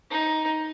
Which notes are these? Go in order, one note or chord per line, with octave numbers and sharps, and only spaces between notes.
D#4